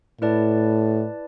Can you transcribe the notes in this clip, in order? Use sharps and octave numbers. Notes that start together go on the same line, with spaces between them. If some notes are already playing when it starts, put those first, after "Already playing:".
A2 E4 B4 D5 A5